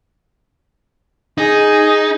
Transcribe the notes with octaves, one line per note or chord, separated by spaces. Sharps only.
D#4 G#4